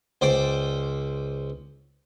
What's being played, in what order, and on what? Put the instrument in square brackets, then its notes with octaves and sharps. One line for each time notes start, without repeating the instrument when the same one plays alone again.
[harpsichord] C#2 C5 D5 G5 D6